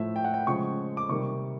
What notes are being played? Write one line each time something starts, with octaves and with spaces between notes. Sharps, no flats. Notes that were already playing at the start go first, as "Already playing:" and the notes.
Already playing: A2 F3 A3 E5
G5
F#5
G5
C#3 F3 G#3 C#6
D6
C3 D#3 G3 C#6